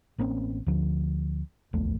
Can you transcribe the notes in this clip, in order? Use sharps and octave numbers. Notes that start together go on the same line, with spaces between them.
A1 A#3 C4 C#4
D2 D3 F3
D1 A#1 E2 A3